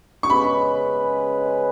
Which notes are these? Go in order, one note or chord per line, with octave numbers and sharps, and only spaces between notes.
C#6
C#3 G#3 C#4 G#4 B4 B5